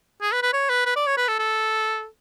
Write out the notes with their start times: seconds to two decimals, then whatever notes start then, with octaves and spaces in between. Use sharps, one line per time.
0.22 G#4
0.32 B4
0.43 B4
0.53 C#5
0.70 B4
0.86 B4
0.96 D5
1.07 C#5
1.17 B4
1.28 A4
1.39 A4